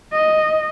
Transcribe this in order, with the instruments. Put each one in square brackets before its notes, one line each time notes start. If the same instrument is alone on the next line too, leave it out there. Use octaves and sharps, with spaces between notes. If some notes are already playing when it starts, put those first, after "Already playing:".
[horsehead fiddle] D#5